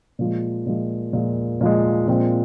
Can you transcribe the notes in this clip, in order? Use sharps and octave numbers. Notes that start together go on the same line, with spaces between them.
A#2 F3 G#3
A#2 F3 G#3
A#2 F3 G#3
A#2 F3 G#3
A#2 F3 G#3 C4 F4